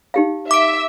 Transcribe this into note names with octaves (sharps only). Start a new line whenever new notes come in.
D#4 G4 F5
E5 D6 D7